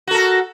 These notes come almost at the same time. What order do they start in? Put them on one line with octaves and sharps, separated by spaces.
F#4 A4 A#4